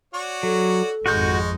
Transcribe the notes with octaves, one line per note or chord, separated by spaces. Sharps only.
F#4 C#5 D5
F#3 A4
G#1 F2 G#3 D#4 F#4 C#6 G6